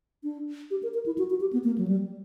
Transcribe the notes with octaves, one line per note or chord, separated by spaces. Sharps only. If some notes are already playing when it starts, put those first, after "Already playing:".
D4
G4
A#4
A#4
E4
F#4
F#4
G4
B3
A#3
F#3
G3